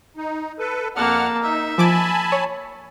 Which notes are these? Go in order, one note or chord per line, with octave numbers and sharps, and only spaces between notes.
D#4
A4 B4
F2 A#3 F#5 A5 F6
D#4 E5
F3 G#5 A5 B5 D6 D7
C#5